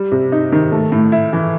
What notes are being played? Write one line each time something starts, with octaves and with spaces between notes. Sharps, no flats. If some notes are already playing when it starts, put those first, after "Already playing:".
Already playing: G3
C3
D#4
D#3
A3
A2
E4
E3